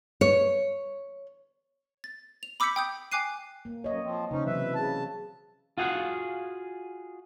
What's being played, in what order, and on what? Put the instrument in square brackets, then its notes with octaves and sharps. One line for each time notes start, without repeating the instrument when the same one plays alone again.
[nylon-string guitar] C#5
[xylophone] A6
F7
B5 D6 E6 G6 B6 C#7
G5 D#6 G6
G5 G#5 D6 F#6 C7 D#7
[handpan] A#3
[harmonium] F#2 [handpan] C#5 D#5
[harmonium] F3 C4
[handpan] C#3 C5 [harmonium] C#4 D#4
[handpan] C3 E3 F#3 [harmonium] B4 E5
[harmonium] C#3 A5
[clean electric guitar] F4 F#4 G#4 F5 F#5